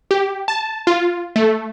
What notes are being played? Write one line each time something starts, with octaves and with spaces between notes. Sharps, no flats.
G4
A5
F4
A3